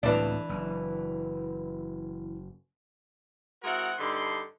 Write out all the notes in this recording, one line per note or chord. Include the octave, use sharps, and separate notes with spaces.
C#2 A2 E3 C4 D4
F#1
G#3 C4 E4 F#4 A#4 F#5
G2 D3 D#4 B5 C6